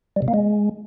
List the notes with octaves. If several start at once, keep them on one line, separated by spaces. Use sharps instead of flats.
G3
C3
A#3
G#3